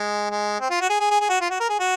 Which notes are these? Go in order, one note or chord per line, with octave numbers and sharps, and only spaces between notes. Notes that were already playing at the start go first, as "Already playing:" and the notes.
Already playing: G#3
G#3
C4
F4
F#4
G#4
G#4
G#4
G#4
F#4
F4
F#4
A#4
G#4
F#4